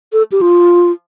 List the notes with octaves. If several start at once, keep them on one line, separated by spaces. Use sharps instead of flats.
A4
G4
F4